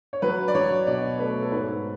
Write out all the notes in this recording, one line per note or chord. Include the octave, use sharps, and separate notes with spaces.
C#5
F#3 B4
D5
F#3 C#5
B2 D5
A3 B4
A4
G#2 B4